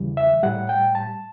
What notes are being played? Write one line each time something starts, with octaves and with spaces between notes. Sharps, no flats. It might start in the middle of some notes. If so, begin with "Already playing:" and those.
Already playing: E2 C#3 E3 G3
E5
A2 G3 F#5
G5
A5